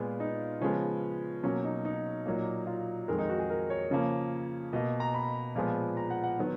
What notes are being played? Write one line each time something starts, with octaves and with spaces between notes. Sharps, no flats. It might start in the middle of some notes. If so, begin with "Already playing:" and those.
Already playing: A#2 G#3 B3 F4
D#4
C#3 F3 G#3 B3 C#4
B2 F#3 A#3 C#4
D#4
D#4
A#2 F#3 A#3
F4
F2 D#3 G#3 A#4
D#4
F#4
G#4
A#4
C#5
C#3 F3 A#3
B2 A#3 D#5
A#5
B5
A#2 F3 G#3 B3
A#5
F#5
F#5
D#3 F#3 B3